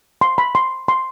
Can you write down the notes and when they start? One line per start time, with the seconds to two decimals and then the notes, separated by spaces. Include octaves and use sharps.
0.21 C6
0.38 B5
0.55 C6
0.88 C6